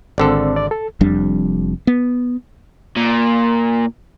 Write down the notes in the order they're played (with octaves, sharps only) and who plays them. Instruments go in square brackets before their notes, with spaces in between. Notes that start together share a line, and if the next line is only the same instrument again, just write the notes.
[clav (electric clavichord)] G#1 D3 A4 [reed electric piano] C4 D5
[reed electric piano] D5
A4
[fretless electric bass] F1 F2 G3 D4
B3
[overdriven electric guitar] A#2